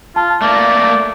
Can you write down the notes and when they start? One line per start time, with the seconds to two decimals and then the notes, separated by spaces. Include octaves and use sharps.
0.16 F4 A5
0.42 A3 A#3 D5